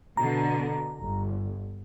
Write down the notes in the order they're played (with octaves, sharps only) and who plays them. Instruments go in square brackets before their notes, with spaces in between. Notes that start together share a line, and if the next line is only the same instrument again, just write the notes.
[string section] B2 D3 [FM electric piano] A#5
[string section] G1